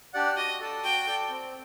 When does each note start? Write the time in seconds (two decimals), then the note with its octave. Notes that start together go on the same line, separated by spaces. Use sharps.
0.14 D4 G4 D5 F#5
0.37 F#4 D#5
0.60 A4 D5 A5
0.83 F#4 G5
1.07 A4 D5 A5
1.30 C4